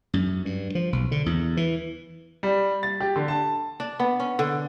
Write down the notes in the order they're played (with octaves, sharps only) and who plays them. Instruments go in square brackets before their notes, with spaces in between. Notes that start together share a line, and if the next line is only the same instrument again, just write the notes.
[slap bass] F#2
G2
F3
B1
D3
E2
E3
[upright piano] G3
A6
G4
D3
A5
[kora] D4
B3
C#4
D3